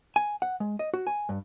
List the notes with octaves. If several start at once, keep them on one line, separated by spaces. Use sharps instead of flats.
G#5
F#5
G#3
D#5
F#4
G#5
G2